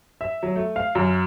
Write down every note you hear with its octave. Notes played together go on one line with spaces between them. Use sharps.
E5
F#3
A3
F5
F#2